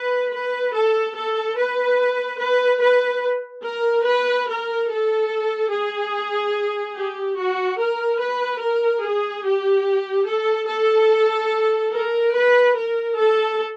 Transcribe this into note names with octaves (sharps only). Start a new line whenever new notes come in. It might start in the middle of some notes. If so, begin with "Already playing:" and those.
Already playing: B4
B4
A4
A4
B4
B4
B4
A#4
B4
A#4
A4
G#4
G4
F#4
A#4
B4
A#4
G#4
G4
A4
A4
A#4
B4
A#4
A4